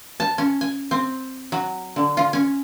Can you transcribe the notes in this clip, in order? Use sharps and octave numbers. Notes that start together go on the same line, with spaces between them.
A5
C#4
G#5
C4
F#3
D3
F4
C#4